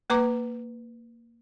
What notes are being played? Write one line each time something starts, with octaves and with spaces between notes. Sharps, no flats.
A#3 B4 A#5 D6